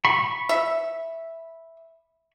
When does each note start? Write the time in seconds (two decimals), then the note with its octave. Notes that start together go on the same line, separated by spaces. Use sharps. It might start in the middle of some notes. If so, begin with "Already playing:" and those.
0.05 B5 C#6
0.49 E5